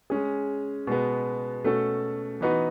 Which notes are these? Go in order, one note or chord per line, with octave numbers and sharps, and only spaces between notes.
G#3 C#4 G#4
B2 G#3 B3
B2 A3 C#4 F#4 A4
E3 B3 D#4 F#4 B4